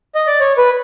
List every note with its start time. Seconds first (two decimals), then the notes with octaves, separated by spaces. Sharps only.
0.15 D#5
0.27 D5
0.40 C#5
0.58 B4